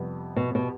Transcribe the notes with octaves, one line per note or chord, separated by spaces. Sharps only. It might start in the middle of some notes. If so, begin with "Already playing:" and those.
Already playing: F2 C3 G3 B3
B2
B2